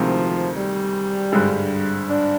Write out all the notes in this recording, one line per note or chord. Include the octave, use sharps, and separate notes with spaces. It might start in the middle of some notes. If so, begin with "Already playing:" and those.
Already playing: D2 C3 D#3 F3 G#3 C4
G3
G#1 G2 D3 G#3
D4